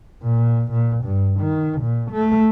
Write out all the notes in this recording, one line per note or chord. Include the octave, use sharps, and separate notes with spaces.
A#2
A#2
G2
D#3
A#2
A3